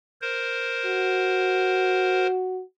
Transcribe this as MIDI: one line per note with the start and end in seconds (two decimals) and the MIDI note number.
0.21 2.27 70
0.21 2.27 72
0.86 2.62 66